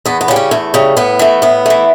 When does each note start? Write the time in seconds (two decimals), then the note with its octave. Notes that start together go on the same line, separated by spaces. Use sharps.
0.06 E2 B3
0.21 B3
0.28 C#3 G3
0.36 C#4
0.51 E2 A3
0.74 C#3 G3
0.97 A2 B3
1.19 E3 A3
1.42 A2 B3
1.66 E3 A3